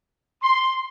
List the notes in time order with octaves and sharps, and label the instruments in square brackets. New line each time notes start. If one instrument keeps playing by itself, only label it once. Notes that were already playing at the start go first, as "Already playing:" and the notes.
[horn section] C6